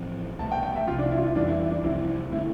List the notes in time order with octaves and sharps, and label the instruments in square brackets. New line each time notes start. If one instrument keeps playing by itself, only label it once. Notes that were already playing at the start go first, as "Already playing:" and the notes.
Already playing: [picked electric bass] A1 A2 F3 C4
[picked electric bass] C2 B2 A3 [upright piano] A5
[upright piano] G5
G5
E5
[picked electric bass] C2 C3 F3 [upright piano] F4
[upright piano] D4
E4
F4
E4
[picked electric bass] F2 E3 G3 [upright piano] D4
[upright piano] E4
E4
D4
[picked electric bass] C2 C3 F3 C4 [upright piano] E4
[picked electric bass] D3 A3 C4 [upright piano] E4